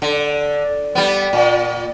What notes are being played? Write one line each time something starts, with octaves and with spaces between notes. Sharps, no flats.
D3
G3 B3
A#2